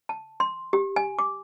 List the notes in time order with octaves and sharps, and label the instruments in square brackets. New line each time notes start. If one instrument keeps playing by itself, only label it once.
[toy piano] A5
C6
G4
G#5
D6